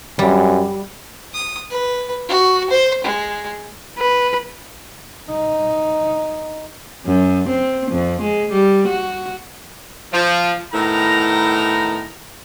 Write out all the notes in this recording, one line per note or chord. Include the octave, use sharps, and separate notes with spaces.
F#2 G3
D#6
B4
F#4
C5
G#3
B4
D#4
F#2
C4
F2
G#3
G3
F#4
F3
A2 D#3 B3 A#5